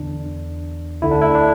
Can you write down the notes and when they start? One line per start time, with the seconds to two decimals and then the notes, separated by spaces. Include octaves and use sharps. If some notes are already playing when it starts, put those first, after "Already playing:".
Already playing: E2 D3 D4
1.02 D2 D3 E4
1.11 D4
1.22 E4
1.35 D4